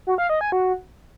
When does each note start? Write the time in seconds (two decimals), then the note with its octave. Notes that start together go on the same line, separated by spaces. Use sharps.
0.07 F#4
0.18 F5
0.30 D#5
0.41 G#5
0.52 F#4